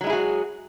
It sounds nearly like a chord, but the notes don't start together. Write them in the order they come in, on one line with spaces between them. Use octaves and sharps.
F#3 G#3 E4 G#4 F#4